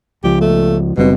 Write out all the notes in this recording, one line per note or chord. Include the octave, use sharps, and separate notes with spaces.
C#2 F3 G4
A3
F#1 B2 G3 C4